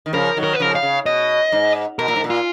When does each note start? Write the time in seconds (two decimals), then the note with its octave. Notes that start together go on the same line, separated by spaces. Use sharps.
0.06 D#3
0.13 C#3 F3 A#4
0.37 D#3 F#3
0.44 A#4
0.53 B4
0.60 C#3 F3 A#4
0.75 F5
0.83 C#3
1.06 B2 D#5
1.52 G#2
1.99 B2 A#4
2.08 A#2
2.16 G#2
2.24 A#2
2.30 F4